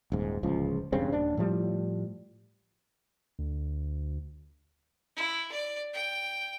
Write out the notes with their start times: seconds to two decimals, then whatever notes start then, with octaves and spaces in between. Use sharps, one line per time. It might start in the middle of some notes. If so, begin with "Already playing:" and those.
0.12 D#1 G#2
0.43 D1 C#2 F3
0.92 E1 G2 C#3 C4
1.12 D#1 D#2 D4
1.37 A2 F3 G3
3.39 D2
5.16 E4
5.52 D5
5.93 G5